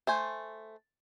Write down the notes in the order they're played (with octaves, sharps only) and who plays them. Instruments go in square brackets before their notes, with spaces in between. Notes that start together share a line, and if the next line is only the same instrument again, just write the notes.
[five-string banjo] A3 C5 G#5